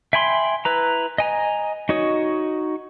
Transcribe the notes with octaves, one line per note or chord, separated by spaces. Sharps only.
E5 G5 G#5 B5 C6
E4 B4 A#5
D#5 G#5 A#5
D#4 F#4 C#5 D#5